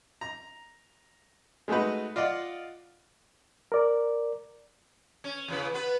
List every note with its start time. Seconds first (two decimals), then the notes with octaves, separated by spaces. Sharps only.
0.21 A#5
1.68 G#3 A3 D#4 F#4 B4
2.16 F4 D5 D#5 F5 F#5
3.72 A#4 D5
5.24 C#4
5.48 E2 C#3 B4
5.74 B3 B4